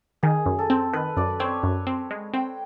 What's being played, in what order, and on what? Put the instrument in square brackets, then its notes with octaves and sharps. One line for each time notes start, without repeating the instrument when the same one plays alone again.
[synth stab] D#3 [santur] G#4
[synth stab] F#2
[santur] A4
[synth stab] C4
[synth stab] D#3 [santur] B4
[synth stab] F#2 [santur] D5
[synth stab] C4 [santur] C#5
[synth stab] F#2
C4
G#3
[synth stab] C4 [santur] G5